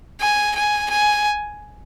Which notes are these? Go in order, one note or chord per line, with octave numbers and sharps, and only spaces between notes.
G#5
G#5
G#5